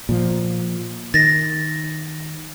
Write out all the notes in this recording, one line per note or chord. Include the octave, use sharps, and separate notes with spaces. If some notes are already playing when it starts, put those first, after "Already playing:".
A#2 F3
D#3 A6 A#6